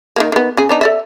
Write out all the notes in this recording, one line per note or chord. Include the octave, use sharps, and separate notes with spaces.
D#3 G#3 A#3
D#3 B3
C#3 G#4
B3 D4 D#4
A4 D5 E5